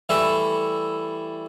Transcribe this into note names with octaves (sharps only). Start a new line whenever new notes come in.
E3 G3 A3 E4 A4